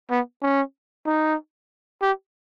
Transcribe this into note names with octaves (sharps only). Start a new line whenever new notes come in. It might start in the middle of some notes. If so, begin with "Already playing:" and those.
B3
C#4
D#4
G4